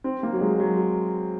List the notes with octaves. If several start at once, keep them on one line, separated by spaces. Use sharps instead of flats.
C4
A#3
F#3
G#3
F#3